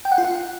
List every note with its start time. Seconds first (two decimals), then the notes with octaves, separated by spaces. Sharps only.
0.05 G5
0.12 F#5
0.18 F4
0.24 F#5